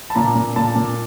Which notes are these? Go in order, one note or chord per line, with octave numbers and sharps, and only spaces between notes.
A5
A#2 A#5
A#2
A#2 A5
A#2